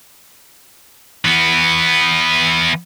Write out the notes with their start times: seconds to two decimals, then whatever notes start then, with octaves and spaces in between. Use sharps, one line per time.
1.25 E3 B3